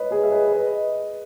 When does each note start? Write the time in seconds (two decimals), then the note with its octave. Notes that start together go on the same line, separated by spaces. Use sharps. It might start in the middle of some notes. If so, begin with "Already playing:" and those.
Already playing: B4 C#5 D#5
0.11 G#4 B4
0.23 E5
0.32 B4 D#5
0.52 B4 D#5